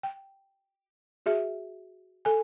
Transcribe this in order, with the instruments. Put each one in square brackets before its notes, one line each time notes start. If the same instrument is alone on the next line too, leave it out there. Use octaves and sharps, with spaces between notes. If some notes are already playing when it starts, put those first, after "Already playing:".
[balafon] G5
F#4 G#4 E5
A4 G#5